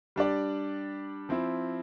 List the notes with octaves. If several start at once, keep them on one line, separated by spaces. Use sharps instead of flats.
G3 D4 G4 D5
F3 C4 E4